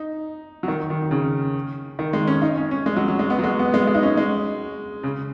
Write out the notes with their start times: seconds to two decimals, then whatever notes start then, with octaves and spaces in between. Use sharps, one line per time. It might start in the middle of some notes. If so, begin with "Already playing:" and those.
Already playing: D#4
0.63 F#3
0.68 D#3
0.90 D#3
1.11 C#3
1.99 D#3
2.13 G#3
2.27 C#4
2.42 D#4
2.57 C#4
2.71 C#4
2.86 G#3
2.96 F#3
3.08 F#3
3.19 G#3
3.30 B3
3.39 F#3
3.43 G#3
3.59 B3
3.74 G#3
3.87 G#3
3.95 D#4
4.03 C#4
4.17 G#3
5.03 C#3